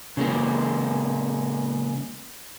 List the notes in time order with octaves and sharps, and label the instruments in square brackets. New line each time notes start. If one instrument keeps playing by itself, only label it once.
[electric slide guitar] C#3 G#3 A#3